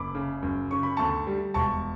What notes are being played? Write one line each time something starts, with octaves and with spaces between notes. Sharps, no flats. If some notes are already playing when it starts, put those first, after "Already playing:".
Already playing: F#1 B5 D6
C#3
F#2
C#3 C#6
B5
D2 A5 C#6
G3
E1 A5 C#6